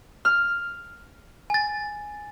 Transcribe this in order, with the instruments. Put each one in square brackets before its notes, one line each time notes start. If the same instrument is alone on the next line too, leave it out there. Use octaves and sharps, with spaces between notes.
[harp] F6
[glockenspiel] G#5 A6